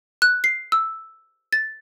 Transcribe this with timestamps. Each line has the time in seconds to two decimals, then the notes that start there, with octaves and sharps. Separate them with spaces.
0.22 F#6
0.44 C7
0.72 E6
1.53 A6